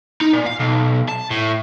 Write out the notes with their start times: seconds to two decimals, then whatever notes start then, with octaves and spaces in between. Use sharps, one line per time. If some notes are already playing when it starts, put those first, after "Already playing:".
0.21 D#4
0.33 A#2
0.46 F5
0.59 B1
1.09 A5
1.31 A2